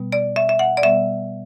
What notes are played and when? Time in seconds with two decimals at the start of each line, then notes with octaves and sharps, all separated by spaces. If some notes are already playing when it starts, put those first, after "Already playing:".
Already playing: B2 G3 B3
0.12 D5
0.36 E5
0.49 E5
0.59 F#5
0.77 D5
0.82 B2 G3 B3 E5